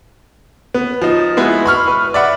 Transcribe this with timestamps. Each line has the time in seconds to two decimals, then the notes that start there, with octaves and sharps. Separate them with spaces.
0.74 B3
1.02 F3 D#4
1.37 G#3 B3 E4 F#4
1.66 B5 C#6 F6
1.88 B4
2.14 D5 E5 F#5 B5